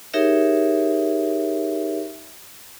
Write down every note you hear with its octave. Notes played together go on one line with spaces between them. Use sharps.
D#4 G4 G#4 A#4 C#5 E5